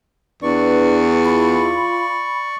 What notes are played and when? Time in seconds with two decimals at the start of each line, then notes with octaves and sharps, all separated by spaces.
0.42 E2 D4 B4 D5 C#6
1.25 F4 B5